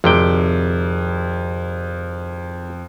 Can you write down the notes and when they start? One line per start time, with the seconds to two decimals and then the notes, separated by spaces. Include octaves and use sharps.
0.04 G#1 F2 C3 G5